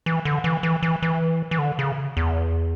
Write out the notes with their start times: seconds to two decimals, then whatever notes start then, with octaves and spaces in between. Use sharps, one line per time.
0.06 E3
0.25 D3
0.44 E3
0.63 E3
0.83 E3
1.02 E3
1.51 E3
1.59 D3
1.79 C#3
2.17 E2